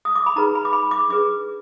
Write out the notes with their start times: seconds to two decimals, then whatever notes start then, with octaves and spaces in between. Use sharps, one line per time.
0.05 D#6
0.15 D6
0.26 B5
0.36 D#4 G#4 B4 A#5
0.55 B5
0.65 D6
0.73 B5
0.91 D6
1.09 D4 G#4 B4 D6